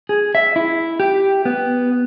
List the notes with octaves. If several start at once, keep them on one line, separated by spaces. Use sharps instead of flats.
G#4
E5
E4
G4
B3